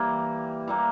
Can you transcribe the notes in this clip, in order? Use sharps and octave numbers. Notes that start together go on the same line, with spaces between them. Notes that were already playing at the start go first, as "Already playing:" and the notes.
Already playing: E3 G3 A#3
E3 G3 A#3